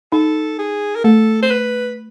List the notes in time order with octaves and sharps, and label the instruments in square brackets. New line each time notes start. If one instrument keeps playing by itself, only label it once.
[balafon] D#4 [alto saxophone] A4
[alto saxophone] G#4
A#4
[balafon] A3 [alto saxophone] A4
[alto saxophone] C5
B4